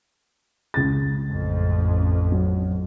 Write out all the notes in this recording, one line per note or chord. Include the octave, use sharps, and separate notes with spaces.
C#2 A6
A1 F2
F#3